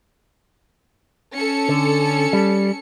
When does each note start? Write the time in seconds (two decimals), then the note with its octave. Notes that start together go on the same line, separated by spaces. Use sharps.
1.36 C#4 A4 C#7
1.69 D3
2.33 G3